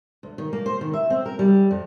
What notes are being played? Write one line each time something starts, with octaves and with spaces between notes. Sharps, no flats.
D2
D#3
A#3
C5
D#3
E5
C4
A#4
G3
F2